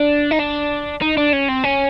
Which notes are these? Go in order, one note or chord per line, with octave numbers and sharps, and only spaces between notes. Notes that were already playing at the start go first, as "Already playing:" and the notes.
Already playing: D4
D#4
D4
D#4
D4
C#4
C4
C#4